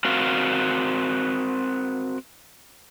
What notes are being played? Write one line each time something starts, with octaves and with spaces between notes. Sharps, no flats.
C4 F#4 A#4 F5